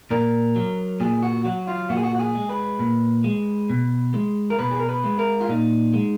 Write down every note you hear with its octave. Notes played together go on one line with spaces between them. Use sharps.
A#2 A#4
F#3
A#2 G#4
F#4
F#3 F#4
F4
A#2 F#4
G#4
F#4
F#4
G#4
G#3
B4
A#2
G#3
B2
G#3
A#4
B2 B4
G#4
A#4
B4
G#3
A#4
F4
A#2 D#4
G#3